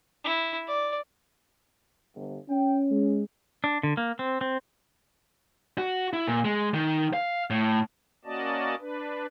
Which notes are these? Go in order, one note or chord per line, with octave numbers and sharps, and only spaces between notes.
E4
D5
G1
C#4 G5
G#3
D4
D3
A#3
C4
C4
F#4
E4
A#2
G#3
D#3
F5
A2
A#3 C#4 F#4 D5 D#5 A5
D4 B4